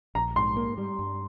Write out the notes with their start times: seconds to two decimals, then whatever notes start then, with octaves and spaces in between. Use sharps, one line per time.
0.15 A#1 A#5
0.36 G#2 C6
0.57 A#3
0.78 G3
0.99 G2